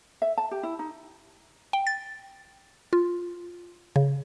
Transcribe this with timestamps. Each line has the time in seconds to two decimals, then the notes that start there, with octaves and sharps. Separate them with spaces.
0.22 E5
0.38 A5
0.51 G4
0.63 E4
0.79 D#4
1.73 G5
1.87 A6
2.93 F4
3.96 C#3